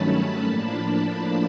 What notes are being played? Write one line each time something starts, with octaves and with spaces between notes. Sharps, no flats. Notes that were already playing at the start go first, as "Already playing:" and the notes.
Already playing: G2 D#3 F#3 A3 C#4 A5 B5
A2 F3 A#3 D4 A5 B5